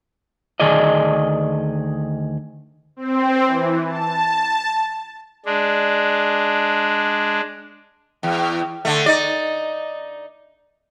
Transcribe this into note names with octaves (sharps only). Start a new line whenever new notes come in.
D2 D#3 G#4 D5 D#5
C4
E3
A5
G#3 D4
E2
D3 A3
D#4 D5